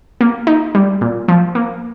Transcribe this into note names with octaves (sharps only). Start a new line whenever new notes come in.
A#3
D#4
G3
A#2
F3
A#3